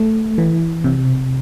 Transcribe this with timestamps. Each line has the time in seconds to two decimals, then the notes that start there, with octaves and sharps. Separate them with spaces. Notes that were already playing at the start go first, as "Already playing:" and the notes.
Already playing: A3
0.38 E3
0.84 C3